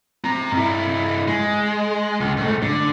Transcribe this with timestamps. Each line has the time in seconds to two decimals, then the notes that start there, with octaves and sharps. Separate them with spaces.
0.24 C4 A#5
0.52 G2 E4
1.28 G#3
2.20 C#2
2.37 G#2 A3
2.62 D3